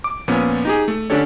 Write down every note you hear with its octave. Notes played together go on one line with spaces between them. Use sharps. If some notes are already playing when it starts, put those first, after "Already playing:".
D6
A#2 F3 B3 C#4
D#4 G4 G#4
A3
D3 C#4 D4 G4 A4 C#5